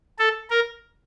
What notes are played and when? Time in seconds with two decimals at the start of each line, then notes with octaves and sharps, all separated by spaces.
0.19 A4
0.50 A#4